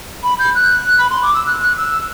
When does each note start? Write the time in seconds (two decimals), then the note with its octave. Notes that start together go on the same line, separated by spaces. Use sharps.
0.23 B5
0.39 G6
0.55 F#6
0.98 B5
1.10 C6
1.23 D6
1.34 E6
1.47 F#6
1.62 F#6
1.77 E6